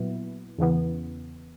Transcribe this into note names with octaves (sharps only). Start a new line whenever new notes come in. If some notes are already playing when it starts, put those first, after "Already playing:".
Already playing: A#2 F#3 B3 E4
E2 C#3 E3 B3